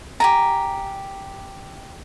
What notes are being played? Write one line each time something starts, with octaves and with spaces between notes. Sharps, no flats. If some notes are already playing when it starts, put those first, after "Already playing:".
G4 G#5 A#5